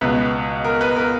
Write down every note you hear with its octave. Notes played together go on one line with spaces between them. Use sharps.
C#2 B2 B4
A#4
B4
A#4